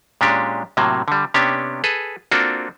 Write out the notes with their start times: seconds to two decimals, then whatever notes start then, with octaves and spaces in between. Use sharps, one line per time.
0.21 A#2 G#3 C#4 D4 G4
0.77 A2 C3 F#3 A#3
1.08 D3 G3
1.34 C3 B3 C#4 D4 G4
1.84 G#4 A4 B4
2.31 A#3 C4 D4 F4 F#4 A4